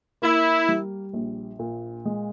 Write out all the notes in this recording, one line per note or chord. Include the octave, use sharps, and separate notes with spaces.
A#3 E4
G3
A#1
A#2
G#3